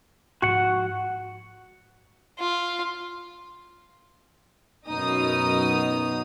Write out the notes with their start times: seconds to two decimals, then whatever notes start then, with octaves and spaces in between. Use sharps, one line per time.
0.42 G#2 F3 F#4 F#5
2.39 F4
4.88 F#2 B2 D#4 D#6